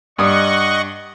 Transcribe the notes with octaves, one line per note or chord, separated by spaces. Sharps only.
G2 D#5 F#5 C#6 D#6